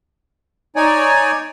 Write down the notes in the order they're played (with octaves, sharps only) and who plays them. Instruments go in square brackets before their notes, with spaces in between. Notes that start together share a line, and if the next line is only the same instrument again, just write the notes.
[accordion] D#4 C#5 D5 G#5